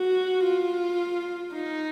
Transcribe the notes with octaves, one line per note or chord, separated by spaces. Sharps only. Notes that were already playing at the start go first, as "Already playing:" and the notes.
Already playing: F#4
F4
D#4